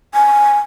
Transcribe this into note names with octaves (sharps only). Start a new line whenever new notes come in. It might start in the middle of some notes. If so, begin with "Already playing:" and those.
G#5